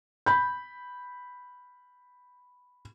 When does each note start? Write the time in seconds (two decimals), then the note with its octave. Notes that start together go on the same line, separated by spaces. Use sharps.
0.26 B5 G6